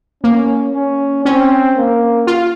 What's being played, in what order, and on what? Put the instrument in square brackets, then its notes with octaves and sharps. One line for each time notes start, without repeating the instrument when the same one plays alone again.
[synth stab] A#3 [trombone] C#4
[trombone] C#4
[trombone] C4 [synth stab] C#4
[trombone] A#3
[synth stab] F4